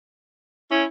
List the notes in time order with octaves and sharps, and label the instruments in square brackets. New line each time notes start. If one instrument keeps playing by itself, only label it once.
[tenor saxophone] C#4 [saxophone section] E4